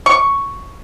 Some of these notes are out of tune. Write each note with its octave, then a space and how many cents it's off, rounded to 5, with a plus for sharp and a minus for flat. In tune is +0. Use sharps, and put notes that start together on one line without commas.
C#6 +5